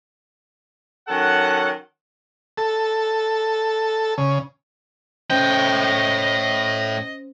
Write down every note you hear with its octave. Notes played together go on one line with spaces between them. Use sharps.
D#3 F#3 C#4 A4 F#5
A4
C#3
A2 C#4 C5 D#5 G5